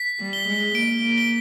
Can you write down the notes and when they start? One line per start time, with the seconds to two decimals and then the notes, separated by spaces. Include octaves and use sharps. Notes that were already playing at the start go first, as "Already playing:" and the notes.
Already playing: B6
0.20 G3
0.33 G7
0.48 G#3
0.75 A#3 D7
1.04 A#3
1.18 G7